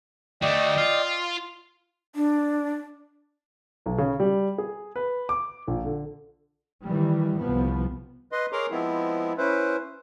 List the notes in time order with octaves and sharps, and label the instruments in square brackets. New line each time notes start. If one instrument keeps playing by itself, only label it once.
[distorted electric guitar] A3 F#4 [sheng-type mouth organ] D5 D#5 G5
[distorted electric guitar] F4
[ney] D4
[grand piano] B1
C#3
G3
G#4
B4
D6
A#1
D3
[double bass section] D#3 E3 G3
C2 F3 B3
[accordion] B4 D#5 C6
G#4 A#4 C#5 A#5 C6 D6
F3 G#3 B3 C4 E4
C#4 E4 B4 C5